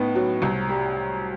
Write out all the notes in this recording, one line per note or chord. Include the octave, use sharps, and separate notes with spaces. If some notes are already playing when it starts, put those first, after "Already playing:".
Already playing: A2 B3 D#4
F#3
C2
G3